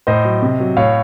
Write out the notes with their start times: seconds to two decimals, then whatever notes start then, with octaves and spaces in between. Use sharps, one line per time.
0.07 A2 C5 D#5
0.25 F#3
0.42 C3
0.60 F#3
0.77 A2 C#5 F5